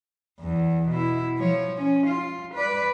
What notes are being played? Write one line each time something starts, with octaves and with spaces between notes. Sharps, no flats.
E2
B2 E4
F3 C#5
C#4
F4
B4 D5